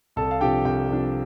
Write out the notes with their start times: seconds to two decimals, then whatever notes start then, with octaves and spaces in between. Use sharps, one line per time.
0.16 C2 A4 A5
0.31 F5
0.41 C3 F3 D4 G4 G5
0.65 C2 G4 G5
0.89 C3 F3 D4